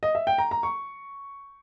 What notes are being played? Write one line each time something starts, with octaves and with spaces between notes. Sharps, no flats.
D#5
E5
G5
A#5
A#5
C#6